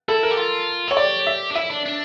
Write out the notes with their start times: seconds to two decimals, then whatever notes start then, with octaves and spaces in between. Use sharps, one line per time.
0.08 E4 A4
0.23 A#4
0.31 G4
0.37 F4
0.88 A4 C#5
0.97 G4 D5
1.27 E5
1.51 D4
1.55 E4 E5
1.70 D4
1.85 D4